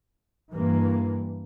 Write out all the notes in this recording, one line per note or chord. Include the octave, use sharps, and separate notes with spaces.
G2 E3 A#3